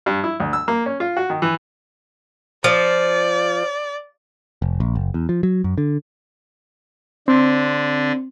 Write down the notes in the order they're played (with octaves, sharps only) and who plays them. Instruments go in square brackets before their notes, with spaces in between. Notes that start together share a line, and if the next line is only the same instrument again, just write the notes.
[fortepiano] G2
E4
D2
E6
A#3
C#4
F4
F#4
D#3
E3
[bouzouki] F3 [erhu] D5
[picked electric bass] F1
A#1
F#1
E2
F3
F#3
F#2
D3
[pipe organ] D3 D4 [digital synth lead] C4